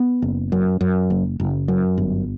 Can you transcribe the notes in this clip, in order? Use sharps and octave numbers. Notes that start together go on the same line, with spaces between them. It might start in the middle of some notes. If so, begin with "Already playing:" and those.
Already playing: B3
F#1
F#2
F#2
F#1
F#1
F#2
G1